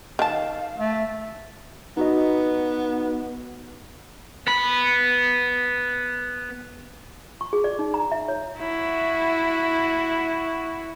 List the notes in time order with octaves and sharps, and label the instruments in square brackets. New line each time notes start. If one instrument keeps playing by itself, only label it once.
[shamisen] D#3 A5 [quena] F5
[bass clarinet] A3
[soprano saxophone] B3 [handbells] D#4 F#4 D#5
[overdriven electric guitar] B3 B5
[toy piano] C#6
G#4
D5
D#4
A#5
E5
C#5
[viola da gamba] E4 F#4